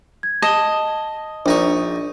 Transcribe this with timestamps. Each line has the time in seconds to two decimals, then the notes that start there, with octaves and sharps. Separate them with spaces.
0.23 G#6
0.42 D#5 A5 E7 G7
1.46 A#1 D4 D#4 C#6